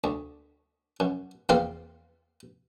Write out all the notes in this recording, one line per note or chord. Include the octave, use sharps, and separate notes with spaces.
D2
F#2
E2 A#3 C4 F4 F5